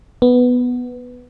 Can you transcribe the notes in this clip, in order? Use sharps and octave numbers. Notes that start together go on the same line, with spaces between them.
B3